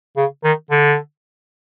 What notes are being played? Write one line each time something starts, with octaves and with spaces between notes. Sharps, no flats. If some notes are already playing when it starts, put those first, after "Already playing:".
C#3
D#3
D3